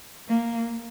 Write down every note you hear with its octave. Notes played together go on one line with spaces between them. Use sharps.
A#3